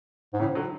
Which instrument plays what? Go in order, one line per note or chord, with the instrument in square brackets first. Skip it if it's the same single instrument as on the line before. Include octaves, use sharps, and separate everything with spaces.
[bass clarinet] G#2
[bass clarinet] A2 [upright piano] C#3 E3
[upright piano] D3 F#3